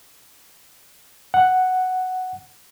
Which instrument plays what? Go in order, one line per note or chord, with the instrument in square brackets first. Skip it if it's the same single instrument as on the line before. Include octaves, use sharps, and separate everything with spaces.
[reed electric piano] F#5